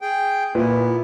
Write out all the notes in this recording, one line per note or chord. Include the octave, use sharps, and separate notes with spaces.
G#4 G5
A#2 B3 E4 B4